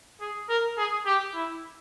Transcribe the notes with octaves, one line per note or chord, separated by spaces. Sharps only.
G#4
A#4
G#4
G4
E4